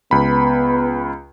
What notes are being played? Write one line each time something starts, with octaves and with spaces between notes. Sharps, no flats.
C#2 B3 B5